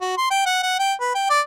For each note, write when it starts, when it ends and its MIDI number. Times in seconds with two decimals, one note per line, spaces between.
0.01 0.17 66
0.17 0.28 84
0.31 0.42 79
0.46 0.58 78
0.63 0.78 78
0.79 0.93 79
1.01 1.11 71
1.15 1.27 79
1.30 1.40 74